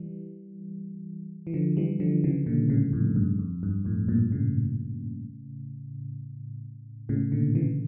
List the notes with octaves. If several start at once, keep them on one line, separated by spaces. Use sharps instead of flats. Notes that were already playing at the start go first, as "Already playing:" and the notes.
Already playing: E3 G3
E3
D3 F3
E3 G3
D3 F3
C#3 E3
A#2 D3
A2 C#3
F2 A2
G2
F2
G2
F2 A2
G2 A#2
A2 C#3
A2 C#3
A#2 D3
C#3 E3